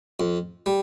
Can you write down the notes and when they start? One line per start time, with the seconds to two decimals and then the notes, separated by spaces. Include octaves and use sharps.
0.20 F2
0.66 G3